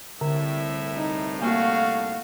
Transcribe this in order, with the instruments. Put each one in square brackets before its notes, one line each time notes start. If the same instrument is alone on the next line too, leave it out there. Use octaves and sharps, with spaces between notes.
[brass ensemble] C2 A2 [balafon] D3 [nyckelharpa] E5
[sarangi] D#4
[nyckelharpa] A3 F#4 [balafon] A#3 [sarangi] F5